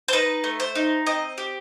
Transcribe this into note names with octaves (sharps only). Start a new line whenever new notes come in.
C5
D#4 B4
A3
C5
D#4
C4 D#5
G4